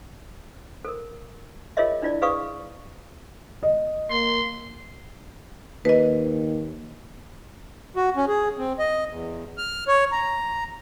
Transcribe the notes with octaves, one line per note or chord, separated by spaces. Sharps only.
A4 A#4
F4 G#4 A#4 C#5 D#5 E5
D4 E4 F4 D5
G#4 B4 F5 C#6 D#6
D#5
A#3 C6
D#2 B4 D#5
F#4
C#4
G#4
C4
D#5
E2
F6
C#5
A#5